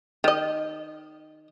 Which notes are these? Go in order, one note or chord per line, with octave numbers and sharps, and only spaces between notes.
D#3 D#5